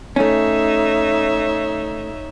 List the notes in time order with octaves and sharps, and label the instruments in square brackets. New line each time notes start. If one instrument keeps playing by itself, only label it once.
[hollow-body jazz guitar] A3 C#4 [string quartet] D#4 C#5 E5